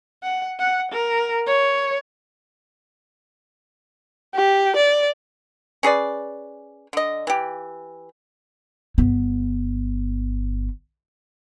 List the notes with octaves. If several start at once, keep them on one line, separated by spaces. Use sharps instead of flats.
F#5
F#5
A#4
C#5
G4
D5
C#4 G#4 B4 D5
D3 D#5
E3 G4
G1 B3